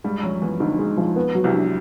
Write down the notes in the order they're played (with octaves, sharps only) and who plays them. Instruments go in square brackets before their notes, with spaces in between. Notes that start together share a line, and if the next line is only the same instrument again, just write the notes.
[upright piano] G2 G3 [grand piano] G#3
[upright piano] F#2 F#3 [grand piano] F3
[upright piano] E2 E3 [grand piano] B3
[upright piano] D2 D3 [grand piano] D#4
[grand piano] G#3
F3
B3
F#3
[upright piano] C2 C3
[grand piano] D4